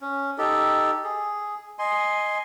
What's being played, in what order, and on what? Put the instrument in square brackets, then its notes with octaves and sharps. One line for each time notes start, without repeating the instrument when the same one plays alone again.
[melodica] C#4
D#4 G4 A4
G#4
D#5 G#5 C6